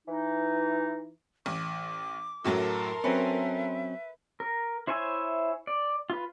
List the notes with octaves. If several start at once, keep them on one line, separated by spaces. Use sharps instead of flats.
E3 D#4
A1 D6
F#2 A2 F#3 A4 A#4 C6
F#3 C4 C#4 B4 E5
A#4
E4 C5 C#5 E5 G#5
D5
F4 B4